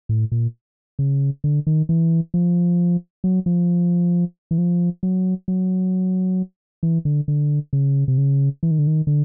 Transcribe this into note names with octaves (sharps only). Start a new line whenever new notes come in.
A2
A#2
C#3
D3
D#3
E3
F3
F#3
F3
E3
F3
F#3
F#3
E3
D3
D3
C#3
C3
C#3
E3
D#3
D3
D#3
D3